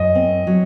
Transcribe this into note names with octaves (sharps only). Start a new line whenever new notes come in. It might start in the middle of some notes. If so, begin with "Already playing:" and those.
Already playing: F#2 D#5
C4
F#3